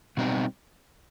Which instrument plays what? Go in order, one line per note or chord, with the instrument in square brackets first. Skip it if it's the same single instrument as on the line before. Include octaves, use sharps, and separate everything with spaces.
[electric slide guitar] B2 G3 C4 D#4